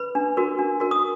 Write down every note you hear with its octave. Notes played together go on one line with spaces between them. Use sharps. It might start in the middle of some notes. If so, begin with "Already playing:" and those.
Already playing: B4 B5
D4
F#4 A#4
D4
F#4 A#4
D#6